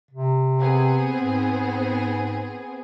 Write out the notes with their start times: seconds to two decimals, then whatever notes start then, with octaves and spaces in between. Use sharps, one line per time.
0.11 C3
0.59 B3 C4 G#4
1.19 G#2